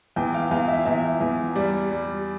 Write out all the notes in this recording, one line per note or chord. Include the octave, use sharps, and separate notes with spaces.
E2 G5
F5
E2 F5
E5
E2 E5
E2
G3 D5
G3